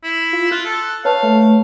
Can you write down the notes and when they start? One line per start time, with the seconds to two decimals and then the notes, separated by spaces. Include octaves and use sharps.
0.03 E4
0.33 F4
0.51 F4 F#6
0.65 A4
1.05 B4 C#5 F5 A5
1.23 A3